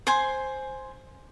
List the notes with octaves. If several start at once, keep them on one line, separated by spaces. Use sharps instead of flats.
C5 G#5 C6